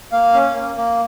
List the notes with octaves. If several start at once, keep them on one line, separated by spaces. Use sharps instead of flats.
A#3 F5
C#4
A#3
A#3